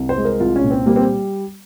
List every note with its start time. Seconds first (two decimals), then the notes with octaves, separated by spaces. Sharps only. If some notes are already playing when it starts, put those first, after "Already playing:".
Already playing: C2
0.09 C5
0.17 G#3
0.25 A#4
0.40 C2 F4
0.56 C#4
0.63 A#2
0.71 C4
0.86 G3 A#3
0.96 C4